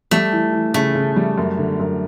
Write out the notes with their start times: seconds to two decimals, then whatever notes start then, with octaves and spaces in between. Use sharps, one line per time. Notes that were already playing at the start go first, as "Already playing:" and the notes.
0.11 G3 A3
0.33 E3
0.53 E3
0.74 C#3 A3
0.95 C#3
1.16 G3
1.38 F#2
1.58 D3
1.80 F#2